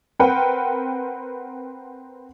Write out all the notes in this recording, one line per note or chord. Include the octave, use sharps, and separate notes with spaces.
C4 A#4 B4 F#5 G5